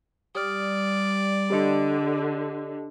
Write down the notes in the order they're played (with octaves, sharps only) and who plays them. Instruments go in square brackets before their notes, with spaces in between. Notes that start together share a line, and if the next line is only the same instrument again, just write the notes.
[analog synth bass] G3 [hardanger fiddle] D5 [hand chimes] D#6 F6
[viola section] D3 [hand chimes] G4 D#5 C#7